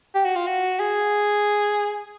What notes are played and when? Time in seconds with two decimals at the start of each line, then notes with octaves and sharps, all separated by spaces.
0.15 G4
0.25 F#4
0.36 F4
0.47 F#4
0.80 G#4